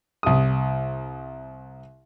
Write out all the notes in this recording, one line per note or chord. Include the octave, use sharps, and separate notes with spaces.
C2 D#6